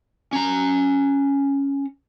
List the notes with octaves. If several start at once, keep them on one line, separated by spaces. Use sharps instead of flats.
C#4 A#5